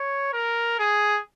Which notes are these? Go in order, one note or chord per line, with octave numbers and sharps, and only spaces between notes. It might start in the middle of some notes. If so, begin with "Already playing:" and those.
Already playing: C#5
A#4
G#4